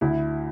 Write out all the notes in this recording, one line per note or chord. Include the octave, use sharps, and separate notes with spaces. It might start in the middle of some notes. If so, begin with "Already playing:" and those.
D2 E4